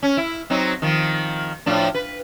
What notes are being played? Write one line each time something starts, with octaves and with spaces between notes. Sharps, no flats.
C#4
E4
F#3 C4 D#4
D#3 F3
A2 F3 D4
B4